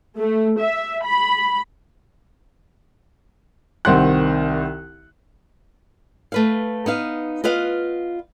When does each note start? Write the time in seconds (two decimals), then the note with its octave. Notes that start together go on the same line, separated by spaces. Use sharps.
0.20 A3
0.60 E5
1.05 B5
3.85 C2 D#3 C4 F#5 C6 F#6
6.32 A3 B4 F5
6.86 B3 D#4 F5
7.44 F4 B4 D#5 F5 F#5